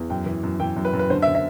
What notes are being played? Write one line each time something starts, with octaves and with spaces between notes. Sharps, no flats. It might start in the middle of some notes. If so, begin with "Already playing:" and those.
Already playing: E2
F#2 G5
E3
F#2
E3 G5
F#2
B4
F#2
B4
D3 C5
E5
D3
E5